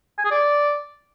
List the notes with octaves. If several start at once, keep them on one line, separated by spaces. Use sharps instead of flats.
G#5
G#4
D5